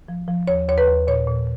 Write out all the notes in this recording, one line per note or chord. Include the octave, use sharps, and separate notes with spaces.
F3
F3
D#2 C#5
D#2 C#5
B4
D#2
A#2 C#5
A#2